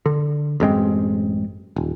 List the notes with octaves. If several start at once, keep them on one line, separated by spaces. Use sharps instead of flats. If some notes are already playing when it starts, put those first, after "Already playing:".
D3
A1 F#2 G#3 C4
D#1